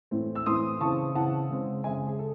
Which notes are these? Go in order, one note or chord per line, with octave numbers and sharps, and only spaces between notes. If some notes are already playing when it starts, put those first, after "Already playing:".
A2 E3 C4
E6
A2 E3 C4 C6 D#6
C#3 E3 C4 A5 C#6
C#3 E3 C4 F#5 A5
C#3 G#3 C4
C#3 G#3 C4 E5 G#5
G#4
A4